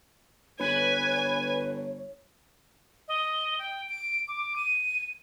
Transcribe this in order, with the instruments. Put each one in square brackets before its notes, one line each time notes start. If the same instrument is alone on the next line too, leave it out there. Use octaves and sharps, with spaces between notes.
[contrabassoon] G1 [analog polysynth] B4 [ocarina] C#5 [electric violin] G#5
[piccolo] D#5
G5
D7
D6
D#7